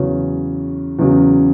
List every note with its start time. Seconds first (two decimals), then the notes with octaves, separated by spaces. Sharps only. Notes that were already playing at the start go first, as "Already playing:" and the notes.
Already playing: E2 C#3 F#3 C#4
0.99 E2 C#3 F#3